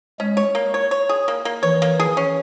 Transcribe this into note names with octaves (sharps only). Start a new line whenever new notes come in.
G#3 C#4
C#5
A#3
C#5
C#5
G#4
A#3
A#3
E3 C#5
A#3
G#4
C#4